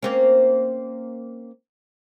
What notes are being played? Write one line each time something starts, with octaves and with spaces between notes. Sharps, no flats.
A#3 C4 C#4